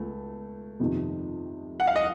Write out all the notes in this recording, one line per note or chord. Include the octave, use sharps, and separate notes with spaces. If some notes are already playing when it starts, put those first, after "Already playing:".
Already playing: C#2 A3
F2 C3 D#3
F#5
F5
D#5